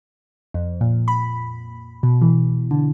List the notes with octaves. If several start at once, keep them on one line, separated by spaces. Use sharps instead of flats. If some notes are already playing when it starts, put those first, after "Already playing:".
F2
A#2
B5
B2
E3
D3